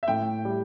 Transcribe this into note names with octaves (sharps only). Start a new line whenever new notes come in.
E5
A2 G5
G3